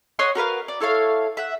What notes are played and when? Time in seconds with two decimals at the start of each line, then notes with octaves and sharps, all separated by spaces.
0.19 C#5 D#5 F#5 C6
0.35 F#4 A#4 B4 F5
0.68 D5
0.80 E4 A4 C#5 F5
1.37 E5 F#5